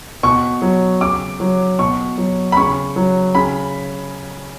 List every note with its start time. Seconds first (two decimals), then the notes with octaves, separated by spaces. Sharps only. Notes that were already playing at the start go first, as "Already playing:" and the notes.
0.23 B2 C#6
0.62 F#3
1.01 C#3 D6
1.40 F#3
1.79 B2 C#6
2.18 F#3
2.52 B5
2.57 C#3 C#6
2.96 F#3
3.35 C#3 B5